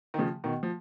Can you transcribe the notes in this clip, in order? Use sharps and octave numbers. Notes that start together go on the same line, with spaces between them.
D#3
C#3 F3
B2 D#3
F3